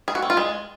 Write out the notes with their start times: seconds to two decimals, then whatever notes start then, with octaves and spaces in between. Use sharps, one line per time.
0.08 G#4
0.15 F#4
0.22 C4
0.30 F4
0.37 G#3